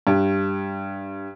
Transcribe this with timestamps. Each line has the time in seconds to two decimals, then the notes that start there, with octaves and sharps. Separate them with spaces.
0.07 G2